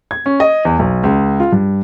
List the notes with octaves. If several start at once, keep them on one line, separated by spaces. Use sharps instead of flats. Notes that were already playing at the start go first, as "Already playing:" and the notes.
G#6
C#4
D#5
E2
B1
C#2
F4
G2